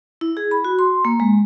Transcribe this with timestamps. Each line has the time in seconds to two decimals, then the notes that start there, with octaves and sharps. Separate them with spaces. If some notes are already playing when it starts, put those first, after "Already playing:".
0.21 E4
0.37 G#4
0.51 B5
0.65 F#4
0.79 C6
1.05 A#3
1.20 G#3